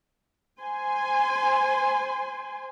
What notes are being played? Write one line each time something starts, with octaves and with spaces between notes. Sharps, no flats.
C5 G#5 C6